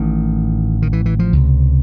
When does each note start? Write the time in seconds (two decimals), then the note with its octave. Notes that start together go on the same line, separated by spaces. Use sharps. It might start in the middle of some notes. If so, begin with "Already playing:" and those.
Already playing: A1 A2 D#3
0.82 D#3
0.93 E3
1.06 E3
1.19 F3
1.33 C#2 C3